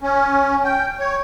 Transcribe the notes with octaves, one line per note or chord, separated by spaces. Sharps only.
C#4
G5
C#5